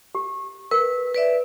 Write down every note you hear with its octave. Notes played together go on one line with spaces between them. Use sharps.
G4
A#4 B4
B4 D5 E5